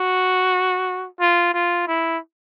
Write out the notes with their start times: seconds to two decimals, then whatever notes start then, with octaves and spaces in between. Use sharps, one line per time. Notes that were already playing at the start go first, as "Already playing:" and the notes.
Already playing: F#4
1.20 F4
1.54 F4
1.88 E4